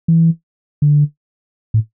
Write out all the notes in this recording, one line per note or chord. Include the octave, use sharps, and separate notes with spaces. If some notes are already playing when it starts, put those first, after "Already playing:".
E3
D3
A2